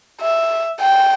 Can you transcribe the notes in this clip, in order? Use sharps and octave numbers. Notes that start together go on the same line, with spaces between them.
E5
G5